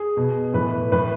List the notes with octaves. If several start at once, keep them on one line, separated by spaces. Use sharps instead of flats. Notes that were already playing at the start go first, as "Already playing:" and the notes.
Already playing: G#4
B2
A2 E3 B4
A2 E3 B4